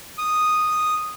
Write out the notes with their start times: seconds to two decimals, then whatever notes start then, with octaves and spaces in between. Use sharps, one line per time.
0.18 D#6